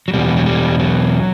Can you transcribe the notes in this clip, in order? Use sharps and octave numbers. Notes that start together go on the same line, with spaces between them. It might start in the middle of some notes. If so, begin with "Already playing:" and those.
F#3
E2 B2 G3
F#3
G3
F#3